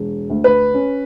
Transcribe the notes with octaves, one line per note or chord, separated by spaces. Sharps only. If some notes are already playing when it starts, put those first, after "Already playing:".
Already playing: E1
D2
B4
C#4